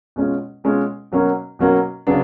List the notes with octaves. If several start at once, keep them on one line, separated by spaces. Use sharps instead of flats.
B2 G#3 C#4 F4
B2 G#3 C#4 F4
B2 F#3 A#3 C#4 F#4
B2 F#3 A#3 C#4 F#4
C#3 F#3 B3 D4